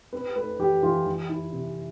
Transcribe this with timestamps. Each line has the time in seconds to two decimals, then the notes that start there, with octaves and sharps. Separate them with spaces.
0.13 C4 B4
0.36 A3 B4
0.59 E3 G4
0.82 E3 F4
1.06 E3
1.29 E4
1.52 C3